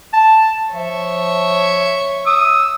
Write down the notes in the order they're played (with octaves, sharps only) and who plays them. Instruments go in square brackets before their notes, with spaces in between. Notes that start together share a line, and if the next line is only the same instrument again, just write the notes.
[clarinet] A5
[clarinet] F3 [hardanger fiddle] C#5 E5
[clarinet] D#6 [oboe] E6